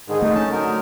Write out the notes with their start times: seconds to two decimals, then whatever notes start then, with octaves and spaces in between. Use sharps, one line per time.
0.08 G#2 D3 D#3 G#4
0.22 A3 D#4
0.35 C#4 A5
0.52 D3 F#3 A#4